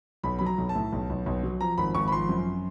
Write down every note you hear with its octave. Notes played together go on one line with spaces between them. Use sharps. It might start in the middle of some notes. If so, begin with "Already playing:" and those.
B1 B5
F#3 B5
A#5
B1
A5
A2
B1
B1
B1
F#3
F3 A#5
G#1 B5
G#1 C#6
B5
F3 C6
F#2